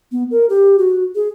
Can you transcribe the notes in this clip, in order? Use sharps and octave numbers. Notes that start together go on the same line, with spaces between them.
B3
A#4
G4
F#4
G#4